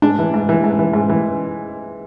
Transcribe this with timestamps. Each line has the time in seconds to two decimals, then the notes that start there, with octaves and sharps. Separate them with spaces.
0.02 G#2 D4
0.19 E3
0.34 G#2
0.49 E3
0.64 G#2
0.79 E3
0.93 G#2
1.10 E3